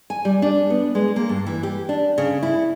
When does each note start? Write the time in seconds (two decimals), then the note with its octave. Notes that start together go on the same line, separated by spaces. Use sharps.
0.10 G#5
0.25 G3
0.42 D4
0.70 B3
0.95 G#3
1.16 A#3
1.29 G2
1.46 E3
1.63 G4
1.89 D4
2.18 C#3
2.43 E4